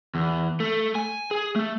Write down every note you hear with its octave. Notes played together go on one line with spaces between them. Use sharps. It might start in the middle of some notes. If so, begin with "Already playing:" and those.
E2
A3
G#5
G#4
A3